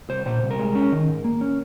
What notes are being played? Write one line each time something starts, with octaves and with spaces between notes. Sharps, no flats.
C2 C5
A#2 C5
C2
A#4
G#3
C#4
D#3
G#2
A#3
C#4